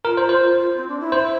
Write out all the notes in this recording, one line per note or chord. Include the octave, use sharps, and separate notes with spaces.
F4 A#4
C5
F4
C5
F4
F4
C4
D4
E4
C5